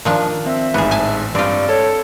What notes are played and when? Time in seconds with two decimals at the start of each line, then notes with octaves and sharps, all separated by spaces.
0.05 D#3 F3 D4
0.46 C4 E5
0.74 A1 G#2 B3 G#4
0.91 G#5 A5
1.35 G2 C4 F4 D5
1.69 A4 C#5